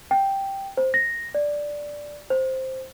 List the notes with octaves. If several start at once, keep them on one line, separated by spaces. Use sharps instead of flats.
G5
C5
A#6
D5
C5